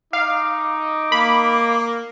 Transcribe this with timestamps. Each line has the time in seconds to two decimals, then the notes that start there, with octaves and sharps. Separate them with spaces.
0.13 D#4 F5 D6
1.12 A#3 B5